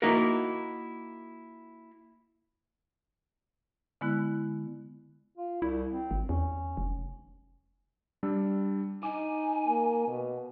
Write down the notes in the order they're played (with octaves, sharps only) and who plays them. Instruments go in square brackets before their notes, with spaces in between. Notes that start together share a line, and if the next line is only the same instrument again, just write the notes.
[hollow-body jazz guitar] A#3 D#4 E4 F#4 A#4
[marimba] D3 G#3 B3 E4 F#6
[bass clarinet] F4
[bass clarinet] C2 [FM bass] E4
[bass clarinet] C4
[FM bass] G#1
[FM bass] E2 [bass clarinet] C#4
[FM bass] F1
[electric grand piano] G3 D4 E6
[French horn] D#4 [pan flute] G#5 [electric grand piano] D6
[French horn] A#3
B2